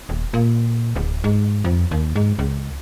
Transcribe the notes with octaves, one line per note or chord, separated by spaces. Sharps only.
D#1
A#2
D1
G#2
F2
D#2
G#2
C#2